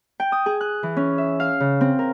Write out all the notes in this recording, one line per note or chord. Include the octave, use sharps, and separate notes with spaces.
G5
D#6
G#4
F#6
E3
C#4
E5
F5
C#3
C4
A#4